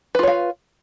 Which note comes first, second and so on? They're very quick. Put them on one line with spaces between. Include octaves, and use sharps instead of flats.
B4 F4 C#5 F5